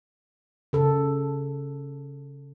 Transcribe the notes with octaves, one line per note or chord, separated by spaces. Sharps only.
C#3 A4